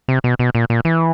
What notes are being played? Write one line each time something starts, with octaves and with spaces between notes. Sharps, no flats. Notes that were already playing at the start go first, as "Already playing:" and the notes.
C3
B2
B2
A#2
A#2
E3